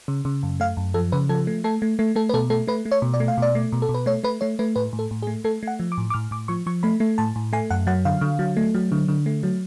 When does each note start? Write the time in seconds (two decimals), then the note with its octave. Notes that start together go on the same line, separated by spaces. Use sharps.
0.08 C#3
0.25 C#3
0.43 F#2
0.60 A3 F5
0.77 F#2
0.94 F3 A4
1.12 C#3 B4
1.29 F3 A4
1.47 A3
1.64 A3 A4
1.82 A3
1.99 A3
2.16 A3 A4
2.29 B4
2.34 B2 A4
2.50 A3 A4
2.68 A3 B4
2.85 A3
2.92 C#5
3.02 B2
3.14 D5
3.20 A3
3.28 F5
3.38 B2 D5
3.55 A3
3.72 B2
3.82 A4
3.89 B2
3.94 B4
4.06 A3 C#5
4.24 A3 B4
4.41 A3 C#5
4.59 A3 B4
4.76 A2 B4
4.93 A2
4.99 A4
5.11 A2
5.22 G#4
5.27 A3
5.44 A3 A4
5.63 A3 F#5
5.80 F3
5.92 D6
5.98 A2
6.10 D6
6.14 A2 F6
6.31 A2 D6
6.48 F3 C#6
6.66 F3 C#6
6.83 A3 B5
7.00 A3
7.18 A2 A5
7.36 A2
7.53 A3 G#5
7.70 F#2 F#5
7.87 F#3 F#5
8.05 D3 F5
8.21 D3
8.39 F#3
8.57 A3
8.75 F#3
8.92 D3
9.08 D3
9.26 A3
9.43 F#3